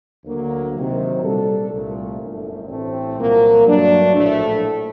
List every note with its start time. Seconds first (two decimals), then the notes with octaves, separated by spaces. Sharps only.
0.24 D2 D3 F#3 A#3
0.73 C3 D#3 F#3
1.22 A#2 G3 D4 A4
1.71 C2 A#2 A3
2.20 G1 F#2 D3 A3
2.68 A1 A2 A3 C4
3.17 C2 A#2 F#3 A#3
3.66 G2 F#3 A3 D4
4.15 A#1 A2 A3